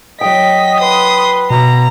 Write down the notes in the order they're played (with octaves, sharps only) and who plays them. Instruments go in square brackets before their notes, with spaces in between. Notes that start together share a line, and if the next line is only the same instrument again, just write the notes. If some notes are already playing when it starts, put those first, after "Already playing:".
[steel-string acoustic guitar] F#3 G5 [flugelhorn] D#5 [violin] B6
[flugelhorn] B4 [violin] C6 D#6
[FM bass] B2 [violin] A#5